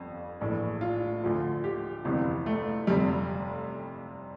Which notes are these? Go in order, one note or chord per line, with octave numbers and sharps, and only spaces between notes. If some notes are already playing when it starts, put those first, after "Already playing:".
Already playing: G1 F2
A#1 A2 E3
F4
D2 D3 F3
G4
G1 F2 C3 E3
A3
F1 F2 C3 G3